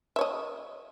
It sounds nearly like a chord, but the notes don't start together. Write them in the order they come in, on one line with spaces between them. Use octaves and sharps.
E5 C#5 D#5